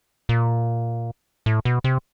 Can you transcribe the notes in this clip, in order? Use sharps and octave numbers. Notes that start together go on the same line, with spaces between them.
A#2
A2
B2
C3